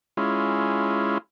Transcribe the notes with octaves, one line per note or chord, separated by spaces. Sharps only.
G#3 C#4 E4 F4